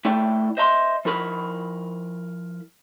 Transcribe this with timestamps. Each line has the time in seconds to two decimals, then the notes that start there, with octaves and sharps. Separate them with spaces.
0.05 A3 E4 D5 G5
0.57 C5 D#5 E5 A#5 C6
1.05 F3 E4 A#4 B5